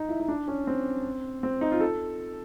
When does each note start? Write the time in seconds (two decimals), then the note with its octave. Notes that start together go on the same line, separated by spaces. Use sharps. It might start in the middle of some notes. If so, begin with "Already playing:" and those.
Already playing: D#4
0.09 E4
0.20 D#4
0.28 D4
0.48 C#4
0.67 C4
1.43 C4
1.61 D#4
1.72 F4
1.80 A4